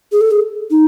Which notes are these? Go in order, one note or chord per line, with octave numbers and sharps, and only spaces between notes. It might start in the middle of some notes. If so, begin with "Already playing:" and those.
G#4
A4
G#4
D#4